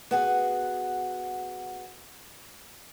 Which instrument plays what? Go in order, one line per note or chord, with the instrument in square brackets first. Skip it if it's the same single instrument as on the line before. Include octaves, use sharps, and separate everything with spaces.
[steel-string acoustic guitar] B3 F#4 G#4